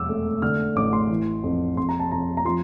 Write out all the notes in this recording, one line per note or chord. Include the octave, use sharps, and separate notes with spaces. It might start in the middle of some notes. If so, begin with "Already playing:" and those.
Already playing: E1 F2 D6 E6
A3
D3 F6
A1 D6
C6
E3
F2
F2 C6
A#5
A5
F2 A#5
A#5
F3 C6